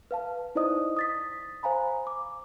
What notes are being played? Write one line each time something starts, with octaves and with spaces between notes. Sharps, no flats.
B4 F5 A5
D#4 E4 C5 D5 D#5 D#6
D#6 A6 B6
C5 F5 G#5 A#5 B5
D6